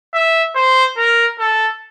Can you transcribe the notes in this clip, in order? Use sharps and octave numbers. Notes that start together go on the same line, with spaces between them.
E5
C5
A#4
A4